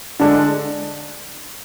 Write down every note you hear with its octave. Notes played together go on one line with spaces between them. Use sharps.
D3 G#3 D4